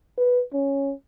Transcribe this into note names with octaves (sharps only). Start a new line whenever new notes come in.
B4
C#4